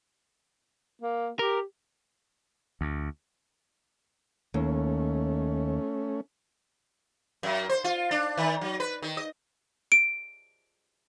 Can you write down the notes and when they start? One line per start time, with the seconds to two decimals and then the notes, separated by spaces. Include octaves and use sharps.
1.02 A#3
1.39 G4 A#4
2.81 D2
4.54 D#2 A3 C#4
7.43 F#2
7.69 C5
7.84 F4
8.11 D4
8.37 D#3
8.61 F#3
8.80 B4
9.02 D#3
9.17 D#5
9.92 D7